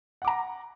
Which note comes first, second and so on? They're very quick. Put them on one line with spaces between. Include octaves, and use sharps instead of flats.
F#5 D6 A#5